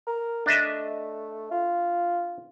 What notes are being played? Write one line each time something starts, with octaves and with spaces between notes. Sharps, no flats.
A#4
A3 D4 D#5 E5
F4